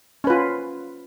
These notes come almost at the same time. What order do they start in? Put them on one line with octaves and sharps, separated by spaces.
C#4 B4 F4